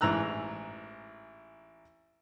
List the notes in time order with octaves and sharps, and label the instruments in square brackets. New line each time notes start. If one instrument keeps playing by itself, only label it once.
[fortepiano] A1 G#2 A#5 E6 F#6